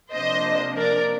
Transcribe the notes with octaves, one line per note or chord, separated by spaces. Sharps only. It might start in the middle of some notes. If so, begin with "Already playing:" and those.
C3 F3 A#3 D4 C5 D#5
A#4 D5